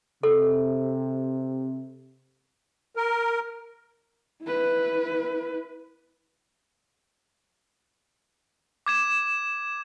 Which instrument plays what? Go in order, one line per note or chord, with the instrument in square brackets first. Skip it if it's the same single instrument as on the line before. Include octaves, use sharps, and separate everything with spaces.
[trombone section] C3 [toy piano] A4
[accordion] A#4
[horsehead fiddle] E4 B4
[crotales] D6 G#6 E7